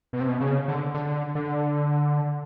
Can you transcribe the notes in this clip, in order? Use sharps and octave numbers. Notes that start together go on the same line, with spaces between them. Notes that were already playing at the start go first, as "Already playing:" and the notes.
B2
C3
B2
C#3
D3
D3
D3